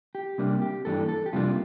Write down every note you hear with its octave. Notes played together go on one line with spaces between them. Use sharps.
G4
C3 G3 A#3 D4
G4
G2 E3 A#3 D4 A4
A4
G4
F2 C3 G3 A#3 D4 F4